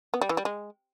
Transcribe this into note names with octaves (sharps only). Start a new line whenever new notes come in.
B3
G3
E3
G3
G#3